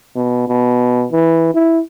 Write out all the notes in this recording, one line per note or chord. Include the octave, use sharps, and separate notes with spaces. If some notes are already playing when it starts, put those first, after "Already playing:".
B2
B2
E3
E4